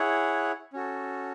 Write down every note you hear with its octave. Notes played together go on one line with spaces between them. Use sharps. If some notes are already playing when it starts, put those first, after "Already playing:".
Already playing: E4 G#4 C#5 F#5
C#4 F#4 A4